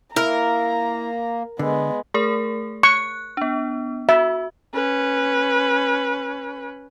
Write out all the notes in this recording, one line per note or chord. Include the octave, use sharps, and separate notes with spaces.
A#3 E4 A#4 A#5
D3 G#3 B3
A3 G#4 A#4
C#6 F#6
B3 D4
F#4 E5
C#4 B4